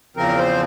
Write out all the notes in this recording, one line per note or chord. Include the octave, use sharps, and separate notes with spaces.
E2 C#3 F3 C4 A#4
C5